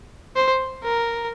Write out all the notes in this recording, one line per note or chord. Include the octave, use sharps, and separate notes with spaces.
C5
A#4